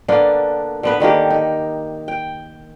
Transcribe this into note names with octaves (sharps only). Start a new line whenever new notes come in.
D3 A#3 B3 D4
D3 B3 B4
D3 D#3 A#3 G4
D#4
G5